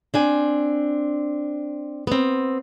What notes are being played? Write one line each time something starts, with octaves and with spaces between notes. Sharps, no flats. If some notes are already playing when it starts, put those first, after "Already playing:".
C4 D4 G#5
B3 C4